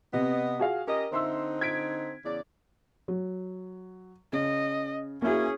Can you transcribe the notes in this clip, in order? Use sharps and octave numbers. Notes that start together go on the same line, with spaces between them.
C3 B3 D#5
F#4 G#4 F5
C#4 G4 A#4 D#5
D3 C4 D#4 E5 C6 E6
G#6 B6 D7
E2 C#3 D5
F#3
C#3 D#5
A#3 C#4 E4 F#4 G#4